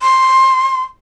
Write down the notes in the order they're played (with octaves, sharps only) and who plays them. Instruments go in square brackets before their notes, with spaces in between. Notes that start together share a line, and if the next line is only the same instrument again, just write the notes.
[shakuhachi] C6